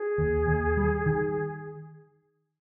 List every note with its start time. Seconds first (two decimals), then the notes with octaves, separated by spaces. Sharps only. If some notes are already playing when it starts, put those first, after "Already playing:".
Already playing: G#4
0.18 D#2
0.47 D#2
0.77 G3
1.06 D#3